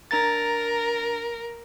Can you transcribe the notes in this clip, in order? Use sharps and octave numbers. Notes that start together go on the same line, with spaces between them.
D4 A#4 A#5 A6